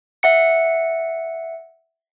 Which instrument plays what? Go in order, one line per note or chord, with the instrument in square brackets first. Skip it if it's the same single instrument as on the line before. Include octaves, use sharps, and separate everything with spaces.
[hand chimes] E5 F#5 C#7